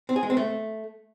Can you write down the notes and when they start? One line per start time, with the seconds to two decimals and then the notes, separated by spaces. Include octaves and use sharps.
0.09 C4
0.16 G#4
0.23 G#3
0.30 C4
0.37 A3